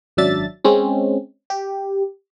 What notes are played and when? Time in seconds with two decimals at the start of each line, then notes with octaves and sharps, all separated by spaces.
0.17 G#1 F#2 F#3 D4 E5 A6
0.64 G#3 C4 C#4
1.50 G4